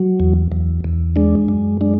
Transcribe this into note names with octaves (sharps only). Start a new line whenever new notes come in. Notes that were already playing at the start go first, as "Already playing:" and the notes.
Already playing: F#3
E2
E2
E2
G#3 D4
F#2
G#3 D4